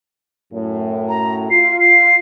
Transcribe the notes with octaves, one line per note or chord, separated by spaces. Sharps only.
F#2 A2
A#5
F4 C7
C7